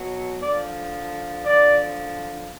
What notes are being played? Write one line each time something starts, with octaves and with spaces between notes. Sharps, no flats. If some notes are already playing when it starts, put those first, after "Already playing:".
Already playing: B2 F#3
D3 F3 D5
D3 F3 D5